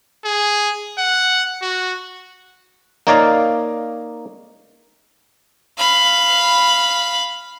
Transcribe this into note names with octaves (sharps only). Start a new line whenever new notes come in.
G#4
F#5
F#4
A#3 D#4 C#5 D5 F5 A#5
F5 B5